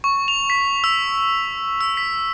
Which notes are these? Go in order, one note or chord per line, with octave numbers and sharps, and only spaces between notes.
C#6
F7
B6
E6
E6
B6